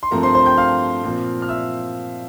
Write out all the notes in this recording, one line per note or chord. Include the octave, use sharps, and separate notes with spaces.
C6
G2 F3 A3 C4 A#4 A#5
C5 C6
C5 C6
G5 G6
F5 F6
A#2 F3 C4
F6
E5 E6